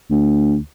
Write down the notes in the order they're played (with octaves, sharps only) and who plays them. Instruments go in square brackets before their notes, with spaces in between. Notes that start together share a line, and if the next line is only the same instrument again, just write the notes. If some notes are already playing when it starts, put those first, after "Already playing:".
[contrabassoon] D2